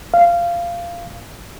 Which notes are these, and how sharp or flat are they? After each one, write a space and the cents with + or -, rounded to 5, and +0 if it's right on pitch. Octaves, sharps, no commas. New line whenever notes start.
F5 -15